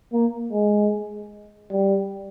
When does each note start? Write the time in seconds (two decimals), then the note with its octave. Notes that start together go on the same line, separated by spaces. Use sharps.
0.13 A#3
0.52 G#3
1.71 G3